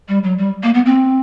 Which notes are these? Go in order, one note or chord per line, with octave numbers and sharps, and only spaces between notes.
G3
F#3
G3
A#3
B3
C4